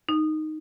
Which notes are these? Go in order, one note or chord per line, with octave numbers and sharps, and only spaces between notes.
D#4